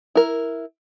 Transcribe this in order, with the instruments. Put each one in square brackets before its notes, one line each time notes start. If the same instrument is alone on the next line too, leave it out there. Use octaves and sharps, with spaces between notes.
[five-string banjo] E4 A#4